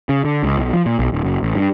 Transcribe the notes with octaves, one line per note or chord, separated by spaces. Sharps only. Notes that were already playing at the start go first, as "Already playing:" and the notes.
C#3
D3
C#2
B1
F3
A#2
B1
D1
F#1
A1
G2